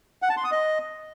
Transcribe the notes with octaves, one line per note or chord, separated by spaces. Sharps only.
F#5
A5
C6
D#6
D#5